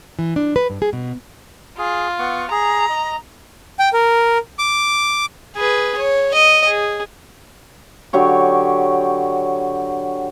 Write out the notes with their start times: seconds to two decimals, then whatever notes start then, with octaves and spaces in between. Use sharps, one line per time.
0.19 E3
0.36 D4
0.56 B4
0.70 G2
0.82 G#4
0.93 B2
1.78 F4 G#4
2.19 B3 F#5 C#6
2.51 G#4 A#5
2.90 D#5
3.79 G5
3.93 A#4
4.59 D6
5.56 G#4 B4
5.98 C#5
6.34 D#5
6.65 G#4
8.13 D3 F#3 G4 C#5